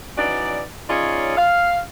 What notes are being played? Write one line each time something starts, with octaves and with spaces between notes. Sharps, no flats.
E3 C#4 D#4 F#4 D5
C#4 D#4 F4 G#4 C#5 D5
F5